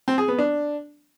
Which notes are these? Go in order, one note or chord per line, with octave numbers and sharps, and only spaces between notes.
C4
G#4
B3
D4